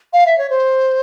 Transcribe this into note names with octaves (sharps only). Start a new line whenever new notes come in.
F5
E5
C#5
C5